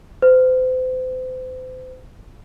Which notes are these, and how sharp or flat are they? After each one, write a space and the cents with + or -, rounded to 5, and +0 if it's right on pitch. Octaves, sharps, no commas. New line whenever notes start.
C5 -35